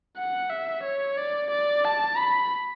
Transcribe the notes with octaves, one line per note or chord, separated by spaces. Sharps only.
F#5
E5
C#5
D5
D5
A5
B5